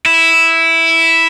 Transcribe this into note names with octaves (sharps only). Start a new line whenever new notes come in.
E4